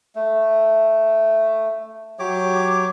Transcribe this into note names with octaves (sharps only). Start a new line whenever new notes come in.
A3
F#3 G4 C#5 D6